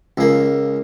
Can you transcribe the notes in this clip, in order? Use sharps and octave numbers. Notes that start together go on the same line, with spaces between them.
C#2 A#3